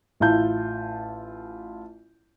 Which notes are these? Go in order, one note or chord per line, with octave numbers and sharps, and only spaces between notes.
A1 E4 F4 A5 G6